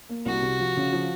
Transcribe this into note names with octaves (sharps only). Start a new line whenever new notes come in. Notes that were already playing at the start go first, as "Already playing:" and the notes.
A#3
C2 F#4
C3
F3
C#3
F3